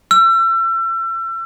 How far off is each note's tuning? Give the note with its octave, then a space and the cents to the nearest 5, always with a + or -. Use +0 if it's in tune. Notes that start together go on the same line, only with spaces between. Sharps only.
E6 +35